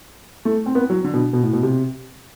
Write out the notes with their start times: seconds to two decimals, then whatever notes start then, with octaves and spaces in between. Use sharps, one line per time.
0.45 A3
0.66 C4
0.75 B3
0.90 F#3
1.04 D3
1.14 B2
1.33 B2
1.43 A2
1.53 B2
1.63 C3